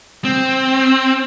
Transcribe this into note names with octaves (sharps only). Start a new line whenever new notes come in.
C4